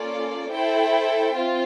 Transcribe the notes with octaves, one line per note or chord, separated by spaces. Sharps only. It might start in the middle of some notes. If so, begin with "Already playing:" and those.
Already playing: A#3 C#4 F4 A4 D5
E4 A4 C5 E5 G5
C4 F4